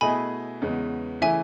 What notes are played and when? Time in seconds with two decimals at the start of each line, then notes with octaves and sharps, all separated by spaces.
0.01 B2 A3 E4 G#4 D#5 G#5 B5
0.62 E2 C#3 G#3 B3
1.22 C#3 E3 A3 E4 E5 G#5